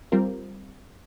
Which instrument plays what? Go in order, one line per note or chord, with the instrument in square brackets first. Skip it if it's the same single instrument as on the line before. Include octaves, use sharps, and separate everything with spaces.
[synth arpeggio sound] G3 C4 F4 A#4